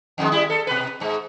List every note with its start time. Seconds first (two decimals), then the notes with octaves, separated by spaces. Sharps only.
0.18 F2 D#3 G#3
0.32 G3 E4
0.50 A4
0.67 B2 B4
1.00 G#2 G#3